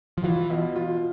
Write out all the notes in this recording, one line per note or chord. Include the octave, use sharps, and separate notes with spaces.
F3
E3 F4
B2
F4